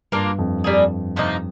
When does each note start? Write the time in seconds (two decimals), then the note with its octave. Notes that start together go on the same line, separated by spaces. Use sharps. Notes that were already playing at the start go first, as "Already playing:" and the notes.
0.12 G2 A#3 D4 F4 A#4
0.38 F2
0.64 G3 A#3 D4 G#4
1.16 C3 F3 A#3 D#4